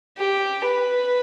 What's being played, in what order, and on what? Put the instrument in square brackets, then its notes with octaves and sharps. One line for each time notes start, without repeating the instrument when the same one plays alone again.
[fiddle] G4
B4